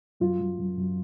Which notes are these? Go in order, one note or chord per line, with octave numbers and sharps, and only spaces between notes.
F#2 F4
F#2
F#2
F#2